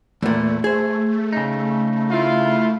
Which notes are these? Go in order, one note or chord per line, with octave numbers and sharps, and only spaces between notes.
E2 A#2 A3
G#4 C5
C#3 D#4
E4 F4